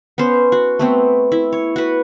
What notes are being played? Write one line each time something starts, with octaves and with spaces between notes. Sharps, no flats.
B3 C#4 C5
F#4
A3 B3 C4
E4
C#5
F#4 B4